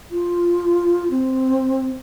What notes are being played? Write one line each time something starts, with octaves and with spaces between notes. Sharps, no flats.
F4
C4